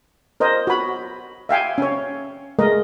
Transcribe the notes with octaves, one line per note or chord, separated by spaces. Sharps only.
A#4 C5 D#5
F#4 B5
E5 F5 G5 G#5
C#4 C#5
G#3 A3 A#4 D#5